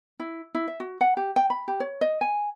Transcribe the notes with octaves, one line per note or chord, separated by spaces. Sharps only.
E4
E4
E5
F#4
F#5
G4
G5
B5
G4
C#5
D#5
G#5